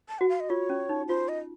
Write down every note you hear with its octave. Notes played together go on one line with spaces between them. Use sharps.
A5
F#4 F#5
F5
D#5
F4 C#5
C#4
D#4
F4 C5
D#5